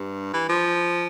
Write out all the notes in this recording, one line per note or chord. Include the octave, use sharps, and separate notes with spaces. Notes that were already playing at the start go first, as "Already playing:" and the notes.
Already playing: G2
E3
F3